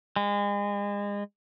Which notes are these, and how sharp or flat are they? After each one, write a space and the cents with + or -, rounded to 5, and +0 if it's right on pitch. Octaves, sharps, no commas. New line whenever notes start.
G#3 -35